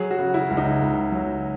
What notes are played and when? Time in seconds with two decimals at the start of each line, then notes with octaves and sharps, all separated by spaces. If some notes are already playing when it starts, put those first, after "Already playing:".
Already playing: F#3 G#4
0.11 F#4
0.19 C#3
0.34 E4
0.49 C#2
0.57 D#4
0.80 C#2
1.12 F#3